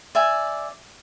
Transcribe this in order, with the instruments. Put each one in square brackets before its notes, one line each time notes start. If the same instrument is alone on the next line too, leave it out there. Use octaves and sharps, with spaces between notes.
[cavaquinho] D5 E5 G#5